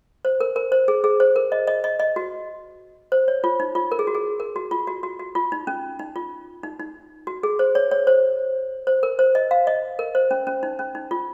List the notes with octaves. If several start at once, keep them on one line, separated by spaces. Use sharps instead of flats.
C5
A#4
A#4
C5
G#4
G#4
C5
A#4
D#5
D#5
D#5
D#5
F#4
C5
C#5
F4
D#4
F4
A#4
G#4
F#4
G#4
A#4
F#4
F4
F#4
F#4
F#4
F4
D#4
C#4
D#4
F4
D#4
D#4
F#4
G#4
C5
C#5
C#5
C5
C5
A#4
C5
D#5
F5
D#5
A#4
C5
C#4
C#4
D#4
C#4
D#4
F4